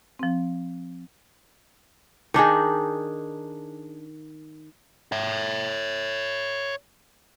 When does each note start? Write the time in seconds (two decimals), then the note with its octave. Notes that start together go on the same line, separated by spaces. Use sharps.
0.19 F3 C4
2.34 D#3 D4 D#4 G#4
5.12 C#5 E5